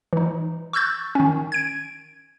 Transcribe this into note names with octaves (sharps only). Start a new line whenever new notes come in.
E3 D#4
C#6 E6 F#6 G6 A6
D#3 C#4
G#6 D7